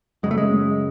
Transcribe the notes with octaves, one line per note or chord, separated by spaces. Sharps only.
F#2 C#3 G#3
A3
G#3